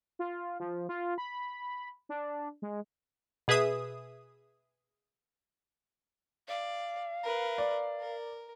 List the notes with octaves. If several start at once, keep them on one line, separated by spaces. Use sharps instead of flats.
F4
F3
F4
B5
D4
G#3
B2 G#4 B4 E5 D#6
D5 F5
A#4 B4
D5
A#4